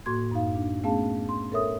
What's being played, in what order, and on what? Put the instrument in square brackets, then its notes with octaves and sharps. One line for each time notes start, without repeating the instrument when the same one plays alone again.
[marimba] A2 A#3 F#4 C6 G#6
F#2 D#4 F5
D4
A3 B3 C#4 G#4 F5 A5
C6
A4 A#4 C#5 E5 D#6